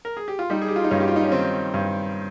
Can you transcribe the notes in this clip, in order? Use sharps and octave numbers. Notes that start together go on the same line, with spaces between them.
A#4
G#4
G4
F4
G3 D#4
G#4
G4
F4
D#4
G2 C#4
G4
F4
D#4
C#4
D#3 C4
G2